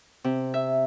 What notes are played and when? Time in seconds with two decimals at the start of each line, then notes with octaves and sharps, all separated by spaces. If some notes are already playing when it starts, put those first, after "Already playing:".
0.24 C3
0.54 E5